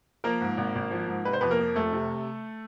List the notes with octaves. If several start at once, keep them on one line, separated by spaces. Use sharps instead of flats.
F3 A#3 A#4
G#2
G#1
G#1
F3
G#2
C3 B4
C5
F2 B3 B4
A#3 A#4
F3
F1 A3 A4
C3